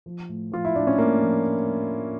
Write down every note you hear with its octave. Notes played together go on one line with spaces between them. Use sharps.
F3
A2
F3 F4
E4
A2 D4
C#4
A2 A#3
F3